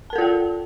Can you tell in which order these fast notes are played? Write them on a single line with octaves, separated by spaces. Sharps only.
A5 A#4 A4 F4 G5